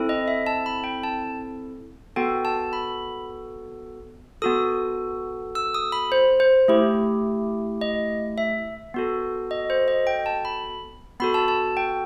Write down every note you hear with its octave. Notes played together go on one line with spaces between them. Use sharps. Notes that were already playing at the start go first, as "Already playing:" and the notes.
Already playing: C4 E4 A4
D#5
E5
A5
B5
G5
A5
B3 F#4 A4 G5
A5
B5
B3 F#4 A4 D#6
E6
D#6
B5
C5
C5
A3 E4 G4
D#5
E5
B3 F#4 A4
D#5
C5
D#5
G5
A5
B5
B3 F#4 A4 B5
A5
A5
G5